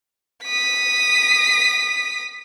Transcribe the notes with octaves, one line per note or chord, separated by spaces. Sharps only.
D#6 B6